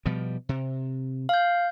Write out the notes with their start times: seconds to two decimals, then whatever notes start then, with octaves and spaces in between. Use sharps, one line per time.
0.06 B2 F3 G3
0.49 C3
1.29 F5 G6